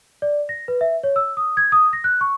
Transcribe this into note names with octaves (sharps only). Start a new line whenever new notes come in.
D5
A#6
B4
E5
C#5
E6
D#6
G#6
D#6
A#6
F#6
C#6